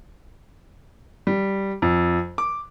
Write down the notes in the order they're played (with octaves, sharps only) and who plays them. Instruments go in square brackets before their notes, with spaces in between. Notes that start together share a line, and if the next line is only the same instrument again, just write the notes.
[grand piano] G3
F2
D6